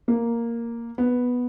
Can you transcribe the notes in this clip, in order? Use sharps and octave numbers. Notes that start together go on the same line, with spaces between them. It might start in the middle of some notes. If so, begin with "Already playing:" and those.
A#3
B3